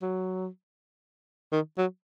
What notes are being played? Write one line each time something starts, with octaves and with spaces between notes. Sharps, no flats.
F#3
D#3
F#3